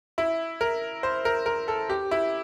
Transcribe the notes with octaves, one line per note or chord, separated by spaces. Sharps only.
E4
A#4
C5
A#4
A#4
A4
G4
E4